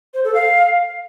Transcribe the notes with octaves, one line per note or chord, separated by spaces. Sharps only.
C5
A4
F5